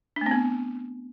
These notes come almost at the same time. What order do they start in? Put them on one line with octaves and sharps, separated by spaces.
D4 A3 C4 B3